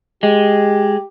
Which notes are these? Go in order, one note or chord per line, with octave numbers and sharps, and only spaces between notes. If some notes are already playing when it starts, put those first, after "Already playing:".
G#3 G4